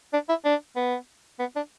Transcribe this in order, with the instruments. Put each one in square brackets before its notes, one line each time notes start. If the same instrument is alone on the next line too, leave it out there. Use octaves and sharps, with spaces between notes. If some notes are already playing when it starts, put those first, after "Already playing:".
[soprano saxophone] D4
E4
D4
B3
B3
D4